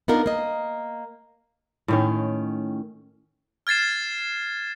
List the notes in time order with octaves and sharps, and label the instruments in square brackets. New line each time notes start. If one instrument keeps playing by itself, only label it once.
[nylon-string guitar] B3 D4 D#4 F4 A#4
A#3 D#5
[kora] A2 D#3 C#4
[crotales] F6 G#6 A6 C7 E7